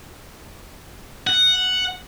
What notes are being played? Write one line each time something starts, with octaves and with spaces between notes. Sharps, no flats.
F#5